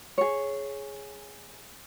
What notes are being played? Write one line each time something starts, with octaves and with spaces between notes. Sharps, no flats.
G#4 C#5